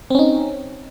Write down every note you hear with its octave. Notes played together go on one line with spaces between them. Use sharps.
C4 C#4 D#4